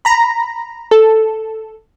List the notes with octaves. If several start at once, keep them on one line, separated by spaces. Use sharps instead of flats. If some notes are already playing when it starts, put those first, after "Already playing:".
A#5 B5
A4